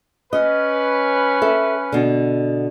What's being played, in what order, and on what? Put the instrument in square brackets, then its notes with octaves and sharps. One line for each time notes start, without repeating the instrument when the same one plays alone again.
[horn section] C#4 B4 [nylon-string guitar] D#5
[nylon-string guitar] A4 E5
B2 D3